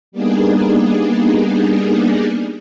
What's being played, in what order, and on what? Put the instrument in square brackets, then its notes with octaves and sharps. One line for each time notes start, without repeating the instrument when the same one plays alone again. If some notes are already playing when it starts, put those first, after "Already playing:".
[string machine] G3 A#3 B3 D4 D#4 G#4